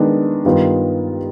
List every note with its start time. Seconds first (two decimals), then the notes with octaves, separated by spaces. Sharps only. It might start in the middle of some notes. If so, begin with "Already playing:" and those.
Already playing: D#3 G#3 B3 D4
0.44 G2 D#3 B3 F4